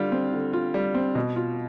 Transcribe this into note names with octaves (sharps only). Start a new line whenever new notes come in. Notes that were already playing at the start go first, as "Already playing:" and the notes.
Already playing: D3 G3 F4
C4
D3
F4
G3
C4
B2
F4